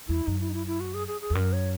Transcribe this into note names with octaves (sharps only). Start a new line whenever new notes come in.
E2 E4
F#2 D#4
E4
D#4
E4
E4
F#4
G#4
G#4
G#4
E2
F#2 A#4
C#5